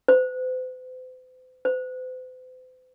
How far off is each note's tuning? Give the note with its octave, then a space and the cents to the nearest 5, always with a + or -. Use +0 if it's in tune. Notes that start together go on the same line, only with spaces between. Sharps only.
C5 -45
C5 -45